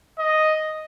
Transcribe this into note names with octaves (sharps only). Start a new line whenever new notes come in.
D#5